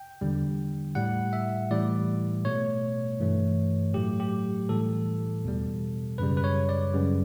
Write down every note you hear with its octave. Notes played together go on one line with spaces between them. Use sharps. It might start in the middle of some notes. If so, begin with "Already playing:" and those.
Already playing: G5
E2 D3 G3
A2 G3 F#5
E5
A2 E3 G3 D5
B2 A3 C#5
G2 E3 A3
A2 F#3 A3 G4
G4
A2 E3 G3 A4
E2 B2 G3
F#2 C#3 G3 B4
B4
C#5
D5
F#2 C#3 G3